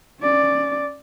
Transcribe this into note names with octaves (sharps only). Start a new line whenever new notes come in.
C#4 D5